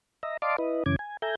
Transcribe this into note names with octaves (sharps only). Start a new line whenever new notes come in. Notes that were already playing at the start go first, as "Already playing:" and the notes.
D#5 E5 A#5
D5 D#5 F5 A5 C6 D6
E4 B4 D#5
F#2 C#3 E3 C#4 D6 G#6
G#5
A4 E5 G#5 A#5 G6